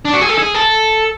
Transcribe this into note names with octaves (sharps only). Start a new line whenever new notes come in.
D4
F#4
G#4
A4
G#4
A4